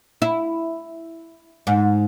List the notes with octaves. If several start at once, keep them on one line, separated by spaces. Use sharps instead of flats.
E4
G#2